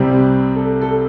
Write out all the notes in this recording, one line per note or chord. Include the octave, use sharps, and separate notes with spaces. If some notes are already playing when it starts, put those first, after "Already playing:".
Already playing: C2 C3 G3 C4 G4
A4
A4